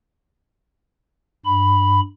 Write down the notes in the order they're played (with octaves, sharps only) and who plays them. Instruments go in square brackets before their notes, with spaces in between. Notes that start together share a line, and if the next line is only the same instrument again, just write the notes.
[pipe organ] G2 B5